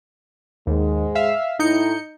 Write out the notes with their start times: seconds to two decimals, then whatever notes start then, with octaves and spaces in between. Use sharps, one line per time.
0.67 D#2 G#2 G#3
1.15 E5 F5
1.59 A2 D#4 E4 G6 C#7